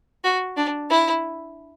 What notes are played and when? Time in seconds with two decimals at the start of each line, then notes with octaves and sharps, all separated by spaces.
0.24 F#4
0.57 D4
0.90 E4